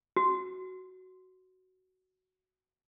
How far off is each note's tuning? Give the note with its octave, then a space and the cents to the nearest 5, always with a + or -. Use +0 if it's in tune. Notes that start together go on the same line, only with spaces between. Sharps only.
F#4 +5